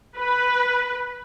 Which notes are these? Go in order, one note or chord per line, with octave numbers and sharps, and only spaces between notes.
B4